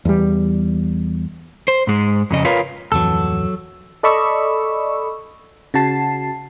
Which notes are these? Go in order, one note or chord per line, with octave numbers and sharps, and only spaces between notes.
E2 G3
C5
G#2 G#3
F2 C#3 D#5
F4 A#4 B4 C#5 F5
D1 F2 E3 F#3 A4
A4 D5 D#5 B5 C#6 E6
C#3 F#4 A5 C7